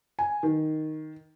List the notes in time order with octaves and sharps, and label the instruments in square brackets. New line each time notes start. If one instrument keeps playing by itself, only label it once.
[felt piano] G#5
D#3